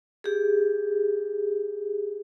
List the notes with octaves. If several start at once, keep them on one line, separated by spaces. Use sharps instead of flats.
G4 G#4